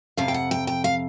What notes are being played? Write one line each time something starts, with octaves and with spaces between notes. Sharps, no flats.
F2 C3 F5
G5
F#5
G5
G5
F5